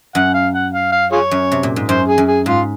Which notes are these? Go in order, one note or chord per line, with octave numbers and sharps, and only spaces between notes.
F#2 F#5
F5
F#5
F5
F5
F4 G#4 C#5
F#2
C3
A#2
G#2
F#2 C5
G#4
F#2
G#4
G#2 F4